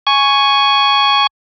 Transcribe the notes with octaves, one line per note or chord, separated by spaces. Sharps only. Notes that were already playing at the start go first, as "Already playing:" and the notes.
G#5 C#6